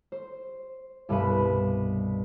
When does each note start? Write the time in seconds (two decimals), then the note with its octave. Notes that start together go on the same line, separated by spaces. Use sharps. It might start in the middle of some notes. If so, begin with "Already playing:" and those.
0.12 C5
1.09 C2 G2 B2 B4 E7